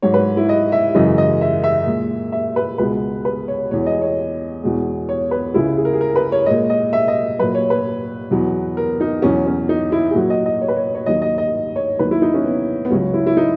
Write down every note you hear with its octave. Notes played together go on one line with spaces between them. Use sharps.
G#2 F#3 C#5
B4
E4
D#5
E5
F#2 C#3 E3 G#3 D#5
D#5
E5
E5
A#2 G#3
E5
B4
C#2 B2 G#3 B4
B4
C#5
E2 B2 G#3 C#5
D#5
C#5
E2 B2 G#3
C#5
B4
C#2 C#3 G#3 E4
G#4
A#4
G#4
A#4
B4
C#5
A#2 G#3 D#5
D#5
E5
D#5
A#2 F#3 B4
C#5
B4
E2 B2 F#3
A#4
D#4
E2 B2 F#3 C#4
C#4
D#4
E4
G#4
A#2 F#3 F#4
D#5
D#5
C#5
B4
C#5
C#5
D#2 D#3 F#3 D#5
D#5
D#5
C#5
D#2 D#3 F#3 B4
E4
D#4
C#4
B3
B3
C#2 C#3 F#3 C#4
E4
E4
D#4